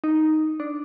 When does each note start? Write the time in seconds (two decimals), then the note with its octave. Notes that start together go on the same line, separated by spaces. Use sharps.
0.04 D#4
0.60 D4